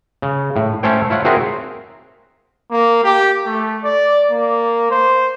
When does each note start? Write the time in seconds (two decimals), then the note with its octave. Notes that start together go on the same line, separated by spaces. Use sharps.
0.22 C#3
0.56 A2
0.83 A3 C#4 A4 C5 C#5 G5
1.10 E4 F4 C#5 F#5
1.25 C4 F#4 G#4 A#4 C5 E5
2.71 A#3
3.03 G4
3.46 A3
3.84 D5
4.32 A#3
4.91 C5